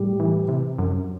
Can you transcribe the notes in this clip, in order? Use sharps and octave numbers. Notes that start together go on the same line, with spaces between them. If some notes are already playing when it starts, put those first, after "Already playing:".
Already playing: A2 G3
E3
C3
F#2